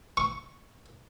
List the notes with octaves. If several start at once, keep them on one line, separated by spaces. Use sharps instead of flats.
C#6